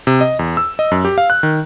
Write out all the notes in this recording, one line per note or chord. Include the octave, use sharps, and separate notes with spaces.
C3
D#5
E2
E6
D#5
F#2
G4
F5
F#6
D#3